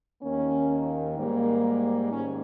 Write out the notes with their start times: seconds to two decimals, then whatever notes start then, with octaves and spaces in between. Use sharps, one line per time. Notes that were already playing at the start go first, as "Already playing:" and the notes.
0.22 D#2 D#3 A#3 C#4
1.17 G#2 G3 A#3
2.12 G#2 D#3 C#4